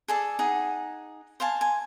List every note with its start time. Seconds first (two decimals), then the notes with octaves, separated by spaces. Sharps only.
0.08 G#4 A4 D5
0.39 D#4 G#4 F#5
1.40 C5 F5 G#5 A5
1.61 G#5